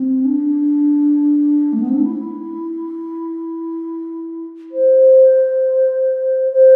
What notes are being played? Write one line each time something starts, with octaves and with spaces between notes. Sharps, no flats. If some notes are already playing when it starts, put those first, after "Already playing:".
Already playing: C4
D4
A3
B3
C4
D4
E4
C5
C5